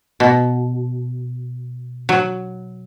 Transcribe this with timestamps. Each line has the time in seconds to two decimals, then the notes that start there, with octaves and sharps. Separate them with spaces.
0.20 B2
2.09 F#3